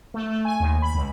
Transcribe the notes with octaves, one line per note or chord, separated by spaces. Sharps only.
A3
A3
G#5
D#2
B5
C#2